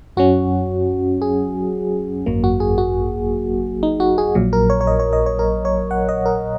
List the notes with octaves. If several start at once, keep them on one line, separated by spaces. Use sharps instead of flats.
F#2 F#3 C#4 F#4
G#4
G#1 F#2 F#3 A#3
F#4
G#4
F#4
D#4
F#4
G#4
A#1 A#2 F#3
A#4
C#5
C#5
D#5
C#5
D#5
C#5
A#4
C#5
F#5
D#5
A#4